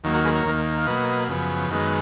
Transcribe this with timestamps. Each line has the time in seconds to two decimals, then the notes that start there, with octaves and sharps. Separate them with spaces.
0.04 D#2 D#3 F#3 A#3
0.14 F#4 A#4
0.25 G#4 B4
0.35 A#4 C#5
0.45 D#2 D#3 A#3
0.78 F5
0.87 B2 F#3 A#3 B4 D#5
1.28 F#2 C#3 F3 B3
1.70 F#2 D#3 G#3 B3